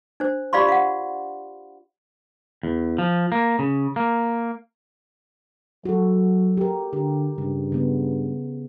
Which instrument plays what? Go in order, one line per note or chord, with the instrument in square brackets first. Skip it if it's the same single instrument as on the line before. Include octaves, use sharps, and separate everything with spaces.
[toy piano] D4 C5
F4 G4 D5 F5 B5 C6
F5 F#5
[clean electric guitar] E2
F3
A#3
C#3
A#3
[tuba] F#3 [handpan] F#4 A4
[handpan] G4 A#4
[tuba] D3 [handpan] G4
[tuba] G2 [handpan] C#3
[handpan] C#3 B3